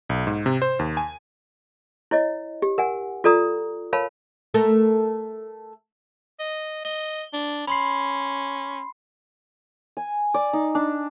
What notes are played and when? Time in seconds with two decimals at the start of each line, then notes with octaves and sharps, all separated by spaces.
0.10 B1
0.27 G#2
0.46 C3
0.62 C5
0.79 D#2
0.97 G#5
2.11 E4 C#5 D#5
2.62 G4
2.78 A#4 F#5 G#5
3.24 F4 A4 D5 A#5 D#6
3.93 A#4 C#5 F5 A5 B5
4.54 A3 A4 A#4
6.39 D#5
6.85 D#5 G7
7.33 D4
7.67 C#4 B5 C6 C7
9.97 G#5
10.34 D5
10.53 D#4
10.75 D4